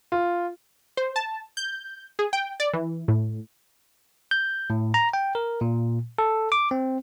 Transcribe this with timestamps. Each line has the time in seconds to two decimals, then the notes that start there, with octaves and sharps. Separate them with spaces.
0.12 F4
0.97 C5
1.16 A5
1.57 G6
2.19 G#4
2.33 G5
2.60 D5
2.73 E3
3.08 A2
4.31 G6
4.70 A2
4.94 A#5
5.13 G5
5.35 A#4
5.61 A#2
6.18 A4
6.52 D6
6.71 C4